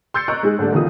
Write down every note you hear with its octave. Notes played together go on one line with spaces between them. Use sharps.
C6 E6 G6 A6 C7 C#7
D#5 A#5 C#6 F#6 D7
G#3 D#4 G#4
G#2 D3 G3 A3 D4
B1 E2 D3 D#3 F3 D#6